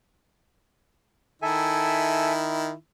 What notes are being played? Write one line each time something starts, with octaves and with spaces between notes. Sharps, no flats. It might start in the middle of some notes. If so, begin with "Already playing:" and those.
D#3 E4 A4 E5 G#5